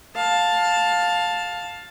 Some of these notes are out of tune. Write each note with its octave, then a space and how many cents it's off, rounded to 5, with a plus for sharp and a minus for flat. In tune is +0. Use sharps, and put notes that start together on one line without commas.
F5 +15 A5 +0